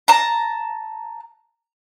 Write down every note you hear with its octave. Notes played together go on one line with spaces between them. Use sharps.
A5 A#5